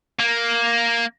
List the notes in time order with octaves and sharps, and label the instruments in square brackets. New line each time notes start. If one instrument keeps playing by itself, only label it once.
[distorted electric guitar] A#3